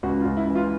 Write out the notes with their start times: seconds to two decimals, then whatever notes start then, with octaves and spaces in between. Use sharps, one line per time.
0.03 C#2 F#4
0.21 F4
0.25 C#2
0.37 E4
0.50 E3
0.55 F4